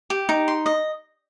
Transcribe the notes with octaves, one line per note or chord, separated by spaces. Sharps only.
G4
D#4
C6
D#5